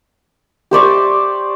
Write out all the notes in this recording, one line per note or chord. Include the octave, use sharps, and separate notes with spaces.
G4 C5 D5 C#6